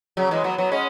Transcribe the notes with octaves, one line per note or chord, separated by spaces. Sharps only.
C#3 F#3
E3 G#3
F#3 B3
F#3 B3
G#3 C#4